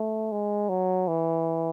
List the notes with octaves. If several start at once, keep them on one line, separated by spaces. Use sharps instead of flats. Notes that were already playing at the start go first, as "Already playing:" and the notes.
Already playing: A3
G#3
F#3
E3